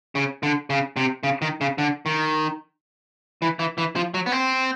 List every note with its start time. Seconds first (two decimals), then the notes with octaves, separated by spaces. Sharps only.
0.15 C#3
0.43 D3
0.70 C#3
0.97 C3
1.23 C#3
1.42 D#3
1.61 C#3
1.78 D3
2.06 D#3
3.42 E3
3.59 E3
3.78 E3
3.96 F3
4.14 F#3
4.26 B3
4.32 C4